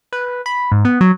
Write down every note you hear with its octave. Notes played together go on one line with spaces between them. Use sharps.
B4
B5
G#2
B3
F#3